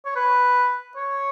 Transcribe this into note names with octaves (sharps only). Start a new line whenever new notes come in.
C#5
B4
C#5